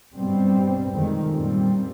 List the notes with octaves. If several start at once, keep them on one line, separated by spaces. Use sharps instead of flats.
G2 B2 G3 B3 C4
F2 C3 D#3 G#3
F#2 A#2 G3 C4